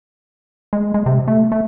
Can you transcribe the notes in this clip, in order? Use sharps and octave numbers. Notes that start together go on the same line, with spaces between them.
G#3
G#3
C3
A3
A3